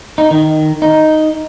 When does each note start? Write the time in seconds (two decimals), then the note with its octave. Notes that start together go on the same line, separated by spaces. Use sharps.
0.18 D#4
0.31 D#3
0.82 D#4